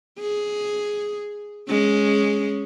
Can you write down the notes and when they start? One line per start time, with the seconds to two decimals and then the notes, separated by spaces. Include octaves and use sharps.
0.20 G#4
1.69 G#3 C#4